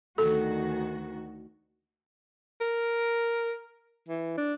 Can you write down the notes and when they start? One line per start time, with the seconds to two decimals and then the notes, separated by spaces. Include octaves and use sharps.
0.18 D2 D#3 F#4 A4
2.61 A#4
4.08 E3
4.37 D4